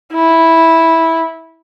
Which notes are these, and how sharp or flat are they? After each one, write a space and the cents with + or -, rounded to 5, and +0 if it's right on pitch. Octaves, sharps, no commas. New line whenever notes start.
E4 -10